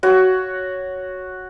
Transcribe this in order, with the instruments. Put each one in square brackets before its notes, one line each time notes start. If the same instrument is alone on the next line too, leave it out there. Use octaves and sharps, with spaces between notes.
[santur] F#4 C#5